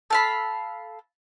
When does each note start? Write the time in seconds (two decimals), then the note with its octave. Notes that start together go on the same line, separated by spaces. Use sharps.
0.10 A4 F5 B5